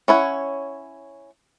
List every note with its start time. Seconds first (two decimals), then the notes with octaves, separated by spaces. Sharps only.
0.08 C#4 E4 C#5 F#5